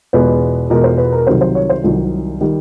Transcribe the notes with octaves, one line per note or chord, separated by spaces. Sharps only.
E2 B2 G#3 B4
E2 B2 G#3 A#4
C5
B4
A#4
C2 C3 D#3 F#3 C5
C5
C#5
C5
C2 C3 D#3 F#3
D#3 G3